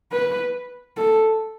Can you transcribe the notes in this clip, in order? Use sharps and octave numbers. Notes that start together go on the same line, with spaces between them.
B4
A4